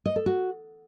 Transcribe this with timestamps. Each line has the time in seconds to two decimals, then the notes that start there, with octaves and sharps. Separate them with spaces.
0.06 D#5
0.16 A4
0.26 F#4